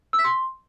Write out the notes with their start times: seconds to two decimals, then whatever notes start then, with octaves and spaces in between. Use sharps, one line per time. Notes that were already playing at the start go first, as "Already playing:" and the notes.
0.13 E6
0.19 B6
0.24 C6